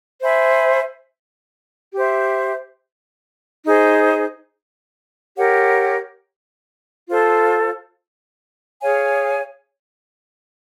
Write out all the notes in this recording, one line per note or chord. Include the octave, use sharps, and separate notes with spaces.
C5 E5 G#5 B5
G4 C5 E5
D#4 G#4 C5
G4 A#4 C#5 F#5
F4 A4 C5
G#4 C#5 F5 G#5